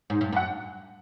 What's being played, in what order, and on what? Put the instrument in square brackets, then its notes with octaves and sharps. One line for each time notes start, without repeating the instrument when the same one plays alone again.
[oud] G#2
G2
[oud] F#2 [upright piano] F#5